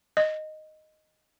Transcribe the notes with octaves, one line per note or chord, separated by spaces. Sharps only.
D#5